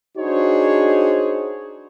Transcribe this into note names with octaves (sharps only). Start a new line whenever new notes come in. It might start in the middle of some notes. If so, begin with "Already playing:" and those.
D4 D#4 F#4 G#4 C5 C#5